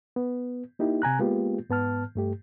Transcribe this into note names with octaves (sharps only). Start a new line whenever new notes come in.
B3
A#3 D#4 E4 G4
C3 G#5 A#5 F#6
G#3 A#3 B3 F4 G4
G#2 B3 A5 F6
G2 A3 G4